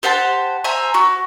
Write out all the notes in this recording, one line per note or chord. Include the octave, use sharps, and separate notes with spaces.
G4 C5 F#5 A5
C5 E5 G#5 A#5
F#4